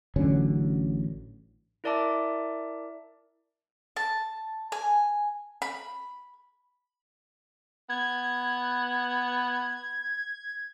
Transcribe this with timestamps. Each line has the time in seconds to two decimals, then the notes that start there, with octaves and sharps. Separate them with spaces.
0.16 A1 D3 F#3 C#4
1.84 E4 A#4 D5 E5 A5 D6
3.96 A5
4.72 G#5
5.62 B5
7.89 B3 G#6